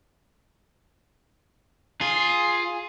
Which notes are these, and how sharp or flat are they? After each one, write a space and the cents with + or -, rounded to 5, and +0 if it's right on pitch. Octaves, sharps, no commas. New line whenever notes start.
F4 +5 G#4 +0